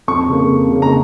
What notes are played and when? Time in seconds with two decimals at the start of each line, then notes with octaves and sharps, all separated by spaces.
0.08 F2 C#6
0.29 C#3 A#3
0.50 F2
0.71 C#3 A#3
0.82 A#5